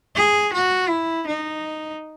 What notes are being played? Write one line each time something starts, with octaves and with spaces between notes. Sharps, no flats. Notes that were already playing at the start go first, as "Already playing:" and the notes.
G#4
F#4
E4
D#4